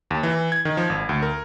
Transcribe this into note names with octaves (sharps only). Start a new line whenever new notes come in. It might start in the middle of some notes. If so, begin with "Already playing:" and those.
D#2
E3
G#6
D#3
F3
G#1
D2
A#4